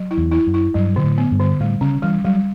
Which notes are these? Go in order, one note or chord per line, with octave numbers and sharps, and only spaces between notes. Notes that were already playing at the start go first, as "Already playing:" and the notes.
Already playing: F#3
E4
E2
E4
F#2
E4
G2 F#3
B2 D3
A2
B3
G2
D3
A2 G3
C#3 C#4
E3 G3
F#3 G3